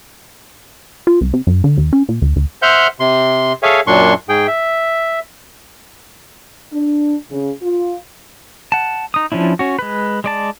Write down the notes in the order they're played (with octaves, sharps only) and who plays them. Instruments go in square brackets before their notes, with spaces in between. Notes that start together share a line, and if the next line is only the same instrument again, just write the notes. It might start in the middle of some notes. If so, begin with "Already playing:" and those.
[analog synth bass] F4
C2
C3
F#2
D3
D#2
C#4
A#2
D2
D2
[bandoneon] C5 E5 F#5 F6 G6
C3 C6
G#4 A4 C#5 E5 F5 G#5
F#2 A#2 F#3 D4 C6 C#6
G#2 G#4 G5
E5
[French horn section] D4
C#3
F4
[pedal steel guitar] F#5 A5
D#4 D#6
F3 C#4 D4 E4
C#4 F#4
G#3 B4
G#3 D5 A5